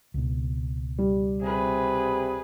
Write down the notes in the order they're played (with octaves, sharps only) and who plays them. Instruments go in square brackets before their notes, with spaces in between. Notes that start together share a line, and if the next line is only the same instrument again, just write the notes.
[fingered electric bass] C#2 B2
[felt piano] G3
[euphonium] C3 [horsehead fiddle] G#4 B4